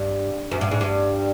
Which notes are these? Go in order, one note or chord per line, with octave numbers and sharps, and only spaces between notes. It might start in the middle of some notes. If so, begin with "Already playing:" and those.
Already playing: G2
F#2
G2
G#2
G2